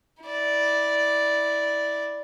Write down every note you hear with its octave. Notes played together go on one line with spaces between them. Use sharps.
E4 D5